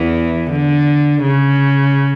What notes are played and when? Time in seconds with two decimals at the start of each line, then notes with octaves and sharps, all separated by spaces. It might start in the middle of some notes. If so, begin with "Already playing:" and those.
Already playing: E2 E3
0.51 D3
1.23 C#3